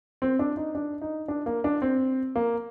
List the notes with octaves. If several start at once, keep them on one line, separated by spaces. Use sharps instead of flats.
C4
D4
D#4
D4
D#4
D4
A#3
D4
C4
A#3